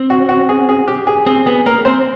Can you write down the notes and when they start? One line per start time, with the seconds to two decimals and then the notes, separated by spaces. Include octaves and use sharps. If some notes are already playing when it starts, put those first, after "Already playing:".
Already playing: C4
0.10 F#4
0.29 F#4
0.49 G#4
0.69 G#4
0.88 G4
1.07 G#4
1.26 C4 G#4
1.46 B3 G#4
1.66 A#3 A#4
1.85 C4 C5